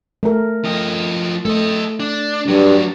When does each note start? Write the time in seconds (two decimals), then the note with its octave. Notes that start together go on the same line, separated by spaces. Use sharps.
0.23 A3 A#4
0.64 F3 D#5
1.45 A3 A4 D#5
2.00 D4
2.48 G2 F#3 D4